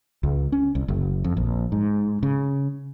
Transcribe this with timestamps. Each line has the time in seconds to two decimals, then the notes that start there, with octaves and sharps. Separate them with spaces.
0.23 C#2
0.52 C#4
0.75 C2
0.88 F#1
1.24 F2
1.37 A#1
1.72 G#2
2.23 C#3